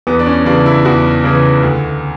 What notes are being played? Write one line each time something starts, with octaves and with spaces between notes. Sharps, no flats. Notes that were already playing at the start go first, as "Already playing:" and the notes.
E2 B3
D4
C#4
C#3 E3 D4
E4
E2 F#4
C#3 E3
D2